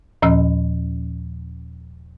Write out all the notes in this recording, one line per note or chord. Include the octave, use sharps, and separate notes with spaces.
D#2 A#2 F3 C#4 E6